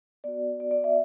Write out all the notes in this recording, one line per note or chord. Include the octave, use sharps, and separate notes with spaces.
B3 F#4 D5
D5
D5
E5